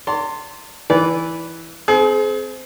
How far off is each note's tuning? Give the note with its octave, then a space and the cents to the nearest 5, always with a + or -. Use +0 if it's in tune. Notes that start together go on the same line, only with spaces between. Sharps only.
D5 -35 A5 +45 C6 +0
E3 +0 B4 +0 D5 -25
C4 -20 G#4 +35